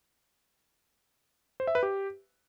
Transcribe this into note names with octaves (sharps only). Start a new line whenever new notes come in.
C5
E5
B4
G4